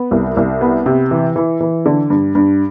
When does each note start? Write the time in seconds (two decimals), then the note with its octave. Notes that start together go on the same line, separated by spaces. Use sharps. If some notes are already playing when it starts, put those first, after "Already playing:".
Already playing: B3
0.11 C2
0.37 C2
0.61 B3
0.86 C3
1.11 E3
1.36 E3
1.61 E3
1.86 D3
2.10 G2
2.35 G2